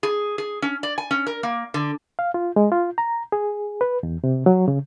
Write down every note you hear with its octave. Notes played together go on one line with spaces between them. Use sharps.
G#4
G#4
C#4
D5
G#5
C#4
A#4
A#3
D3
F5
F4
G#3
F4
A#5
G#4
B4
E2
C3
F#3
C#3